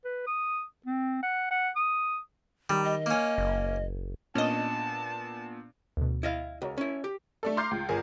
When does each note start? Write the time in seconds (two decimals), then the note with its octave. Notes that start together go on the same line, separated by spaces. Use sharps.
0.05 B4
0.27 D#6
0.86 C4
1.23 F#5
1.51 F#5
1.76 D#6
2.70 D#3 G3
2.84 D#5
3.06 A#3 C#4
3.38 F#1
4.35 A#2 B3 C#4 D4 D#5 A5
5.97 D2 B2
6.23 E4 D#5 F5
6.62 C#2 F#4 A#4 C#5
6.78 C#4 E4
7.04 G4
7.43 A3 D4 A4
7.57 A#5 C6 D6 F6 G6 C7
7.71 C#2
7.89 G1 G#4 A#4